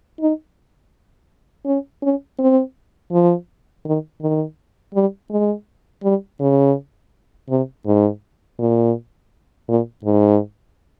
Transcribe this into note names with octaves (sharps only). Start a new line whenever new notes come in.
D#4
C#4
C#4
C4
F3
D#3
D#3
G3
G#3
G3
C#3
C3
G#2
A#2
A#2
G#2